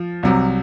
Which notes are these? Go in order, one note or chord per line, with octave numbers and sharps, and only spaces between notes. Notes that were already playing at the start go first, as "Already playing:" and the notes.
Already playing: F3
C2 C3 F#3